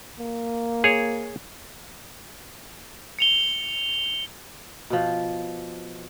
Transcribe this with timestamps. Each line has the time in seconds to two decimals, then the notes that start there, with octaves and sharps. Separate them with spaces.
0.19 A#3
0.84 G#4 C#5
3.19 C#7 F7 G7
4.90 B2 F3